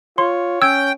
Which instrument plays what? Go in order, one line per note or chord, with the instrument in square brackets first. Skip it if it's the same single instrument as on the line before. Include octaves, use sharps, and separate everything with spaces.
[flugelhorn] F4 [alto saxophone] C#5 [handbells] C6
[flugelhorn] C#4 [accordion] G5 [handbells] E6 G#6